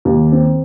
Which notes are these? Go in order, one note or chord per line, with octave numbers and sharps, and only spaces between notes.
D#2
C4